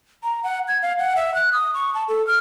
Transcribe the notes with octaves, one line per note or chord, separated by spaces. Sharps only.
A#5
F#5
G#6
F5
F#5
E5
F#6
D#6
C#6
A5
A4
F6